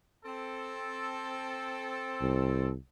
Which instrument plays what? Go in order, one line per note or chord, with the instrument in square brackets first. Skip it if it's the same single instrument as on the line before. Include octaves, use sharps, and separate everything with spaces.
[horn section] C4 A4
[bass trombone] C2